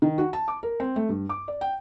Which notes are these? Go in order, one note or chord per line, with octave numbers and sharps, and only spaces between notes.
D#3
F#4
A5
D6
A#4
C4
A3
G2
D6
D5
G5